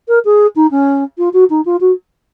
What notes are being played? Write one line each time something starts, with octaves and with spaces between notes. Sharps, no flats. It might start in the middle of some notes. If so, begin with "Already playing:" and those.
A#4
G#4
D#4
C#4
F4
F#4
D#4
F4
F#4